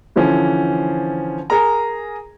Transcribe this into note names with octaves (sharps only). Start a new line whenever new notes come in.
D3 E3 F3 C#4
G#4 A#4 A#5